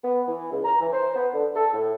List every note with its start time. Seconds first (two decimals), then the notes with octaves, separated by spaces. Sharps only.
0.04 B3
0.28 E3
0.51 C#2
0.65 A#5
0.80 E3
0.93 C5
1.16 B3
1.34 D3
1.55 A4
1.74 A2